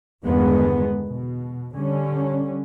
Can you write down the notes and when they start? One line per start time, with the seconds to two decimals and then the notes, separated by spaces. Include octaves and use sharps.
0.25 E2 G2 D3 D#3 G#3 B3
1.05 B2
1.74 D3 G3 C#4